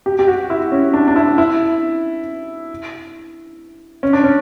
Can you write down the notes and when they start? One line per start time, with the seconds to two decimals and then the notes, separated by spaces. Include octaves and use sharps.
0.06 G4
0.19 G4
0.28 F#4
0.50 E4
0.72 C#4
0.94 D4
1.08 D4
1.16 E4
1.38 E4
4.03 C#4
4.13 D4
4.24 C#4